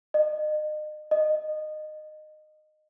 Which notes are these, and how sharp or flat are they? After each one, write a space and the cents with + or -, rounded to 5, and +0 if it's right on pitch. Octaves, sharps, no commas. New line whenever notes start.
D#5 -35
D#5 -20